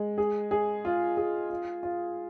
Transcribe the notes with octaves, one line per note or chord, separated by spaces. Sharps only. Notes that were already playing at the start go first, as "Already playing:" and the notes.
Already playing: G#3
G#4
G#4
F4
G#4
F4
F4